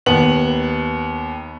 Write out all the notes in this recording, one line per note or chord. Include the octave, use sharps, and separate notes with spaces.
D#2 B3 F#7